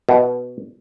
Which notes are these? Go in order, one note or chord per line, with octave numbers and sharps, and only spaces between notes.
B2